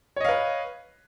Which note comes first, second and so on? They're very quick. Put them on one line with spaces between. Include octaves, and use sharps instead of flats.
C#5 D#5 F5 B4